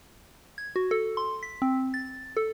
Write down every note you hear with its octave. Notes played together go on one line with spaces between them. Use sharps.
G#6
F#4
A4
C6
B6
C4
A6
A4